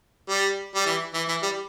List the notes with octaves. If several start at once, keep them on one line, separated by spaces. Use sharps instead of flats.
G3
G3
E3
E3
E3
G3